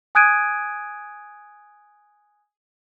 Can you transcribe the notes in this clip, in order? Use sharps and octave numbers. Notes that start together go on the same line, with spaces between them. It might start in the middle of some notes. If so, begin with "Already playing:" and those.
G#5 D#6 F#6 G#6 D7 D#7